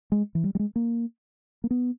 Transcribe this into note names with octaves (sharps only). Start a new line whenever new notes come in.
G#3
E3
G3
G3
G#3
A#3
A#3
B3